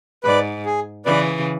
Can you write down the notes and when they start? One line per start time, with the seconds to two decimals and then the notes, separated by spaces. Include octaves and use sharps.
0.24 G#2 B4 D5
0.66 G#4
1.05 C#3 E3 B4 D5